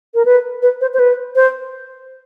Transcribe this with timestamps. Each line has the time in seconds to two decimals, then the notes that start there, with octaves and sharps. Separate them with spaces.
0.15 A#4
0.25 B4
0.62 B4
0.81 C5
0.94 C5
0.99 B4
1.36 C5